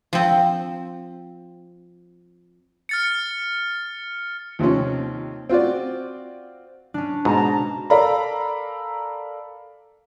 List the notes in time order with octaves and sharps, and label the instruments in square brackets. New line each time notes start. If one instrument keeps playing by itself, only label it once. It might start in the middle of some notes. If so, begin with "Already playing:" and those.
[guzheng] F3 C4
[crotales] F6 A6 C#7
[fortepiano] D#2 C3 F3 C#4
C4 F4 F#4 D5
[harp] C#4 D4
[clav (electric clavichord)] G#2 [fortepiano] B2 [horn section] C5 A5 A#5
[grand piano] A4 A#4 D5 F5 A#5 B5